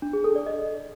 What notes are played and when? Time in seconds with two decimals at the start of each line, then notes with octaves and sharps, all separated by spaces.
0.02 D4
0.13 G#4
0.24 A4
0.35 D5
0.47 D#5